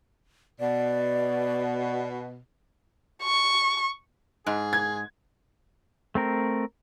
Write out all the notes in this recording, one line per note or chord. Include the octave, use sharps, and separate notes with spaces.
B2 D5
C#6
G#2 G#4
G#6
A3 C4 A#4